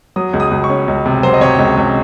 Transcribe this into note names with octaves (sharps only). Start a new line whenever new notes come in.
F#3 D#6
C#2
D#6
C#2
C#6
C#4
C#2
C3
F#3 C5
D#5
C3 C#5
C#2
C#2